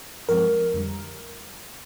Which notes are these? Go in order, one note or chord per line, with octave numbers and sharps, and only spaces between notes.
G2 F3 G#3 C4 A#4
F2 D3 G3